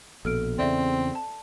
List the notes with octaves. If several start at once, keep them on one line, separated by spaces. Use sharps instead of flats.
A#1 B2 A4 F6 D7
E2 C#3 C4 D5 E5
A5